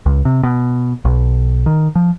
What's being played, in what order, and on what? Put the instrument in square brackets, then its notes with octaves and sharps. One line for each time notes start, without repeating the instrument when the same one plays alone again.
[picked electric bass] C#2
C3
B2
B1
D#3
F3